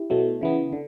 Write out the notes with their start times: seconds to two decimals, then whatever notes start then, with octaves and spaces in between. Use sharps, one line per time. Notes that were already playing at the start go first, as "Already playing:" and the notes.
Already playing: E4 G4
0.10 B2 F#3 A3
0.41 C#3 E3 B3
0.73 D3